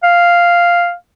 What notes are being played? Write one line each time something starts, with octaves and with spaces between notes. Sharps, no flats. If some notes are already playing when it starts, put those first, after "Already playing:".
F5